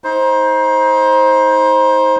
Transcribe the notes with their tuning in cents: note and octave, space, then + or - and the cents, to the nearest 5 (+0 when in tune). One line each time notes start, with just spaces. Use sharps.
D#4 +35 C5 +10